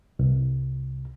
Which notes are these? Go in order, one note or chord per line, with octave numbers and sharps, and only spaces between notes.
C2